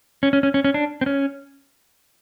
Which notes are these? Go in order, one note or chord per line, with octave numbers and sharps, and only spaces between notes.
C#4
C#4
C#4
C#4
C#4
D4
C4
C#4